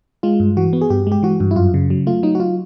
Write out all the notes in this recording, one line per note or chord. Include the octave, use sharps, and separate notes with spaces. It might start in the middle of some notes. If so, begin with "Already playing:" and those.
G#3 F4
G2
E3 F#4
B3
G#4
G2 G4
G#3 G4
E3 F#4
G2
E4
F#2 F4
C#3
F#3
A3 F4
F#3 D#4
F#4
F4